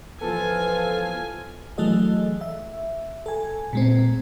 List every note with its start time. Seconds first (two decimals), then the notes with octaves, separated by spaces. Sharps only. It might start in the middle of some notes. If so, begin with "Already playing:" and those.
0.21 E3 F3 B3 F4 A4 G#5
1.78 E3 F#3 A3 G#4 A4 D#5
2.41 E5
3.26 A4 G#5
3.73 A#2 G#3 C4